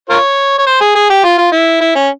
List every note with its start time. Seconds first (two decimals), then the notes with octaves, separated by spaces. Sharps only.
0.10 F4 A#4 C#5
0.59 C#5
0.67 C5
0.81 G#4
0.95 G#4
1.10 G4
1.24 F4
1.38 F4
1.52 E4
1.81 E4
1.95 C#4